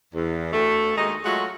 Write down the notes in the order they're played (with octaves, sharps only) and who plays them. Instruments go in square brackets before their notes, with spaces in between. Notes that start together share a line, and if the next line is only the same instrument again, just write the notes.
[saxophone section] E2
D2 A3
D#2 G#3 D#4 F#4 D#5
F#3 G#3 A3 F4 F#4